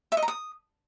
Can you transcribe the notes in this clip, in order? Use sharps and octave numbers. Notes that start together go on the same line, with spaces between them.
E5
D#5
A#5
D#6